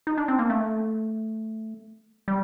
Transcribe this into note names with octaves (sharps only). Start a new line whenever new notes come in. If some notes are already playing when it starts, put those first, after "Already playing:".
D#4
D4
C4
A#3
A3
G3